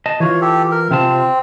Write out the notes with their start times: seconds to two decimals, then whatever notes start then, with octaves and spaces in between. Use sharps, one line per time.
0.06 D#5 A5
0.20 E3 F4 C#5
0.41 G4 A4
0.71 A#4
0.91 C3 C4 F4 A5